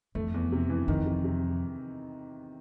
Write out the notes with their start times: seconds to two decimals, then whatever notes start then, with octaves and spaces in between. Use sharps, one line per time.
0.15 F2 A3
0.34 E2
0.52 C3
0.69 E3
0.88 F2 D#3
1.06 C3
1.24 C3